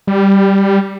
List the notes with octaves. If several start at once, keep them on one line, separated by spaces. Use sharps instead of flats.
G3